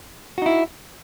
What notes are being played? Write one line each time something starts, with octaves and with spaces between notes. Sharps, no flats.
D#4 E4 F#4